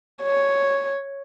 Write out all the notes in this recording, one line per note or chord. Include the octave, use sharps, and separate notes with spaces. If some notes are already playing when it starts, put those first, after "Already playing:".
C#5